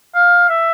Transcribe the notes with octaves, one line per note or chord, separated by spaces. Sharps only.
F5
E5